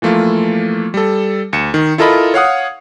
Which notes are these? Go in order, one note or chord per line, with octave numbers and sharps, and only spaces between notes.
E3 F3 A3 A#3 F4
G3 A4
D2 C#7 E7
D#3
E4 F4 A4 A#4 D#5 B5
C#5 F5 F#5 D#6